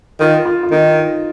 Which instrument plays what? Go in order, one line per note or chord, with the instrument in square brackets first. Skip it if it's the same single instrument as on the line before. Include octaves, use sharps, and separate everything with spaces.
[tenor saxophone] D#3 [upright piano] F4
[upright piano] F4
F4
[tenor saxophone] D#3 [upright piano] D#4